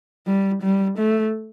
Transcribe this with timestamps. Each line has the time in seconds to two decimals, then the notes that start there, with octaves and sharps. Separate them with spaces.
0.27 G3
0.63 G3
0.98 A3